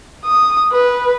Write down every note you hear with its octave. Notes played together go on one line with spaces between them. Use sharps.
D#6
B4